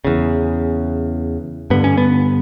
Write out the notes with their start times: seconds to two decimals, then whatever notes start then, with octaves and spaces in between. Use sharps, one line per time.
0.05 E2 C#3
1.70 G2 D3 B3
1.84 C#4
1.97 B3